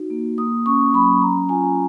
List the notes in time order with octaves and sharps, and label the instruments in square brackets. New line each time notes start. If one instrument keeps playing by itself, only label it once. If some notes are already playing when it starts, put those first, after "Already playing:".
Already playing: [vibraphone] D#4 F#4
A#3
A#3 D#6
C#4 C#6
F#3 B5
C#4 A#5
F4 G#5